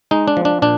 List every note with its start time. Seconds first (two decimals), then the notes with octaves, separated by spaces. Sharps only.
0.11 G#3 D#4
0.28 D4
0.37 F3
0.45 D4
0.62 A#2 D4